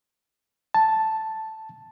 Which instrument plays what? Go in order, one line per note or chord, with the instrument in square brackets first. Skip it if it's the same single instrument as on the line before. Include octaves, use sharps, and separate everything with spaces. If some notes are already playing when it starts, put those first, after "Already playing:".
[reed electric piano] A5